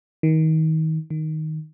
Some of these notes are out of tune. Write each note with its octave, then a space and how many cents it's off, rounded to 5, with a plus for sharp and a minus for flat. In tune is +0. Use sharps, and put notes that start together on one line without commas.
D#3 +30
D#3 +5